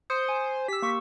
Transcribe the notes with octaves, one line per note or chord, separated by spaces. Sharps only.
C5 D#6 G6 C#7
G#5
G4 E6 B6
A#3 C#6